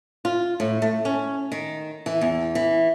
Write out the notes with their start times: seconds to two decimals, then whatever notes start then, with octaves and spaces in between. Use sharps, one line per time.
0.25 F4
0.60 A2
0.82 A3
1.05 C#4
1.52 D#3
2.06 E3
2.21 E2
2.55 E3